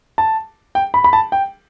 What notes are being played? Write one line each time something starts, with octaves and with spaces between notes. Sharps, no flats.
A5
G5
B5
B5
A5
G5